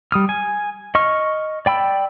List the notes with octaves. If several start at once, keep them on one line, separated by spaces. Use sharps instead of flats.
G3 D#6 F6
G#5
D#5 C#6 F6
D5 G5 B5 E6